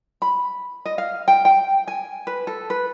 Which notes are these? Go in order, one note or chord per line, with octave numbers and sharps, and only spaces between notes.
B5
D#5
F5
G5
G5
G#5
B4
A4
B4